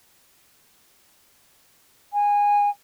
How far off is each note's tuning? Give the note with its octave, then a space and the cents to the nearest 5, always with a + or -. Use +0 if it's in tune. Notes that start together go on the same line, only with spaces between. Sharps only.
G#5 -20